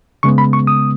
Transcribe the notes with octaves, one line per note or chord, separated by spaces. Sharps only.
C#3 G#3 B3 C#6
B5
C#6
D#6